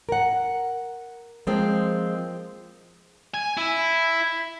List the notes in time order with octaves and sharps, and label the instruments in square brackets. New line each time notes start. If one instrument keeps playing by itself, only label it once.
[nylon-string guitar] A#4 F#5
F3 G#3 A#3 C4
[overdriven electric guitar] G#5
E4